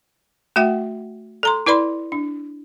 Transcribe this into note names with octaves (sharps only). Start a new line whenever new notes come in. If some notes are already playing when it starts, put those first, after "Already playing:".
A3 F#4 E5 F#5 G5
A4 A#5 C6
E4 B4 D5 B5 C6
D4